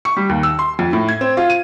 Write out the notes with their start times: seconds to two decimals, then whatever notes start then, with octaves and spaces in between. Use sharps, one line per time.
0.05 C#6
0.17 G3
0.29 D#2
0.43 E6
0.59 C6
0.79 F2
0.93 A2
1.08 G#6
1.21 C4
1.37 F4
1.50 D#7